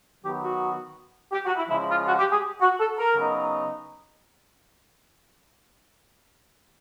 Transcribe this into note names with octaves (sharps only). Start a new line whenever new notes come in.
D#3 F#3 B3 G4
F#4
G4
F#4
E4
C#3 F3 G#3 E4
F4
F#4
G4
G#4
F#4
A4
A#4
C#3 F#3 B3 D#4